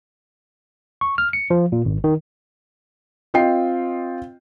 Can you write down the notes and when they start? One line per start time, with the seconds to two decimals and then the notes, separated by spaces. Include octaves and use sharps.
1.01 C#6
1.18 F6
1.33 C#7
1.50 F3
1.72 A#2
1.85 G#1
2.04 D#3
3.34 C4 F4 D#5 G5 C7